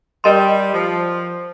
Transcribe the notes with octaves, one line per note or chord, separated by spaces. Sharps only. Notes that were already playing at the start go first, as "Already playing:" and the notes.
G3 A#4 D#5 A5 C6
F3